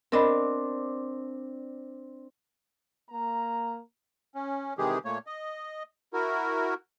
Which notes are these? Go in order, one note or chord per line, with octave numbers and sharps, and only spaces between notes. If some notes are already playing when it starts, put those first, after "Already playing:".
C4 D4 A#4 D#5 B5
A#3 A#5
C#4
C3 D#3 E3 G#3 G4 G#4
A#2 A3 A#3 C#5
D#5
E4 F#4 A#4